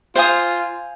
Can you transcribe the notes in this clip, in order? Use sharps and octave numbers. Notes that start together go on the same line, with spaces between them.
F4 C5 F5 G#5 D#6